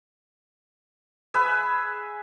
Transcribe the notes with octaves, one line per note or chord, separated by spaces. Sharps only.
G#4 B4 E5 B5